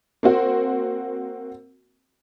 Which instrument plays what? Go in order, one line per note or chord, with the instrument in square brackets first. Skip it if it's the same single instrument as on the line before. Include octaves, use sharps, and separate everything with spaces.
[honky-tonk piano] A#3 C4 F#4